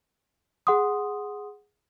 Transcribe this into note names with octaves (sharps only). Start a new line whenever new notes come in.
G#4 F#5 C6 D#6